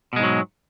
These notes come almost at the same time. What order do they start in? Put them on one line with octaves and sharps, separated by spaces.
B2 G#3 G#2 F#3